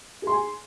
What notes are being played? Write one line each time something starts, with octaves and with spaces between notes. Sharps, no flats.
G#4 G#5 C6